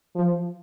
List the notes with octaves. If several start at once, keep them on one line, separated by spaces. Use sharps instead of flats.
F3